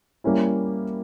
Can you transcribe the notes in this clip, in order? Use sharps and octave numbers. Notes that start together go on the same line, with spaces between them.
G3 A#3 C#4 E4